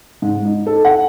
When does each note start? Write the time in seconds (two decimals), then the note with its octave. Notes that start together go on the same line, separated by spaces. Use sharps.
0.22 G#2
0.45 D#4
0.66 A4
0.85 F#5